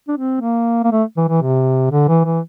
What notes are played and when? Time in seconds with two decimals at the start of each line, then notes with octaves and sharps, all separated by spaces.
0.08 D4
0.17 C4
0.41 A#3
0.84 A#3
0.92 A3
1.17 E3
1.29 E3
1.42 C3
1.91 D3
2.08 E3
2.25 E3